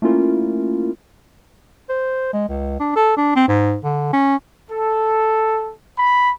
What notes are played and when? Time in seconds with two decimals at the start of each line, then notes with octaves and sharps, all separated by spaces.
0.02 A3 A#3 C#4 E4 F4 A#4
1.89 C5
2.33 G#3
2.49 C#2
2.80 D4
2.96 A4
3.17 D4
3.36 C4
3.48 G#2
3.84 D3
4.13 C#4
4.70 A4
5.98 B5